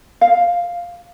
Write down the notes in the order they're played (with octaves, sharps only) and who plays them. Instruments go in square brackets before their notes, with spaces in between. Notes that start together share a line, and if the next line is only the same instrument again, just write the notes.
[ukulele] F5